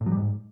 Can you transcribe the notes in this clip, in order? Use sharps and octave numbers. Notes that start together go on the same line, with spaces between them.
A2
F#3
G3
G#2